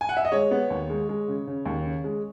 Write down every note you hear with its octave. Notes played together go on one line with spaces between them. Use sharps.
G#5
F#5
E5
D#5
G#3 C#5
B3
D#2
G#3
G#3
C#3
C#3
D#2
C#3
G#3